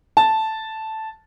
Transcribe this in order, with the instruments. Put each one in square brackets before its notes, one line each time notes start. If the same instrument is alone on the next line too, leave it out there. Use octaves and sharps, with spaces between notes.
[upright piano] A5